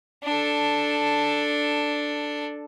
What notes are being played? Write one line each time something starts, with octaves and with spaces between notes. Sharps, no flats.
D4 A4